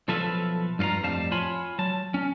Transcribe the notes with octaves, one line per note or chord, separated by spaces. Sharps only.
B1 F3 A4 B4 E5 F5
G2 F4 C5 F5 A#5
F2 A2 G3 F5 A5
F4 C#5 G#5 B5
F#3 A5
C#4